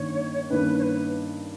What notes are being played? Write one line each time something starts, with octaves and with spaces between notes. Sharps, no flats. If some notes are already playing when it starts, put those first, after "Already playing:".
Already playing: G2 D#3 A#3 C#4 C#5
G2 D#3 A#3 C#4 B4
C#5
B4